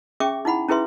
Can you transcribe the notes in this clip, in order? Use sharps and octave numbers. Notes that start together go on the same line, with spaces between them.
C#4 G#4 E5 G5 C#6 D6
D#4 E4 F#5 B5
C#4 E4 G#4 B4 E5 C6